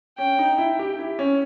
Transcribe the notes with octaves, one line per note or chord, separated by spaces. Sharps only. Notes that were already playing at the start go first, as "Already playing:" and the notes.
C#4 G5
D#4
E4
G4
E4
C#4